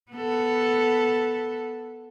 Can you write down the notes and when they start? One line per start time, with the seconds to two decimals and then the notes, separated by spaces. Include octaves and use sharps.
0.12 B3 A4